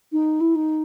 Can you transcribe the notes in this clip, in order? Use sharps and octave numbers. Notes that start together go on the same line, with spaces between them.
D#4
E4
D#4